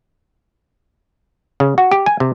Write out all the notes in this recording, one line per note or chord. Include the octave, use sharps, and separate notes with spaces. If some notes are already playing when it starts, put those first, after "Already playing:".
C#3
F#4
G4
G#5
C3